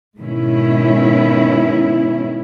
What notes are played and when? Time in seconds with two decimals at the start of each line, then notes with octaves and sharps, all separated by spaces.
0.19 G#2 B2 D#3 C#4 E4